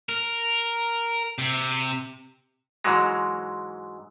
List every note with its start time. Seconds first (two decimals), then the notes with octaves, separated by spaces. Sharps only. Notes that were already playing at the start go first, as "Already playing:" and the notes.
0.09 A#4
1.38 C3
2.84 G#2 E3 F#3 G#3